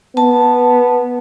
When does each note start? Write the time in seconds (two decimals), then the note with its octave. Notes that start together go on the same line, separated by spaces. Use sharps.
0.17 B3 A5